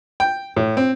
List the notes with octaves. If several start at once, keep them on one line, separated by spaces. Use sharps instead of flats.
G5
A2
C4